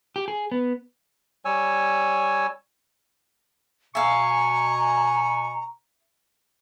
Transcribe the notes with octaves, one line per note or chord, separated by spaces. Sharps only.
G4
G#4
B3
G3 C#5 G#5 E6
B2 E5 F5 G#5 A#5 C#6